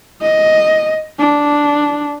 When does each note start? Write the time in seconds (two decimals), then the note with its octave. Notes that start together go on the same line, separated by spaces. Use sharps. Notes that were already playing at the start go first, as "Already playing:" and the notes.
0.22 D#5
1.19 D4